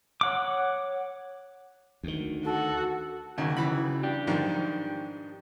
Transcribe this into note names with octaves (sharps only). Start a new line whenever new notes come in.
C#5 F#5 D6
D2 D#3
F#4 A4
D#2 C#3 F#4
E3 B5
D4 G4
G#2 D#3 F3